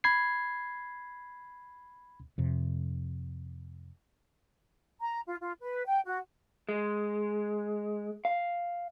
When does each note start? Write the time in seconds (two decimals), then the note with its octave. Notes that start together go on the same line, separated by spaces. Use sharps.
0.04 B5 G#6 C7
2.38 F2 C3
5.01 A#5
5.27 F4
5.41 F4
5.60 B4
5.86 G5
6.05 F#4
6.69 G#3
8.25 F5